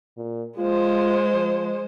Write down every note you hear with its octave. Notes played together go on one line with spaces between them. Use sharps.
A#2
G#3 F4 C5
F3